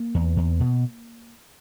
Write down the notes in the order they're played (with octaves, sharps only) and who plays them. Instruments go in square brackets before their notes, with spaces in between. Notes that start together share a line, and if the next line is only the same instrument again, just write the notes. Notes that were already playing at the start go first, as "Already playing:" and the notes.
Already playing: [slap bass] A#3
E2
E2
B2